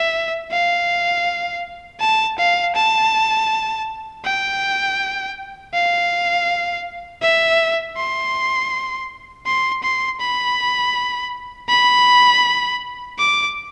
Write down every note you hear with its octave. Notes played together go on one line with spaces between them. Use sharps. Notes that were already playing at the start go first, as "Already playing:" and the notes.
Already playing: E5
F5
A5
F5
A5
G5
F5
E5
C6
C6
C6
B5
B5
D6